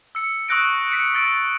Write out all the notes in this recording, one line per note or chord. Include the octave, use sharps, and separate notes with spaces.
E6 C#7
C#6 D#6 E6 F#6 A#6 D7
B6 C#7
E6 A6 D7